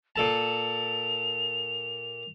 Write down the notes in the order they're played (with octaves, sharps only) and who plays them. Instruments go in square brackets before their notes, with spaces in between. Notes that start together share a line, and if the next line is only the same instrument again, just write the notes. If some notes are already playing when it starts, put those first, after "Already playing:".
[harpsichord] A#2 A4 A5 [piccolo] F7